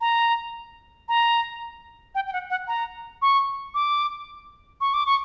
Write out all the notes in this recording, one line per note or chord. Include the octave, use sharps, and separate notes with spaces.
A#5
A#5
G5
G5
F#5
F#5
A#5
C#6
D6
C#6
D6
C#6